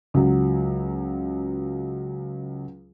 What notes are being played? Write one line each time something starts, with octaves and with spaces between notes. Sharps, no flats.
C#2 F#3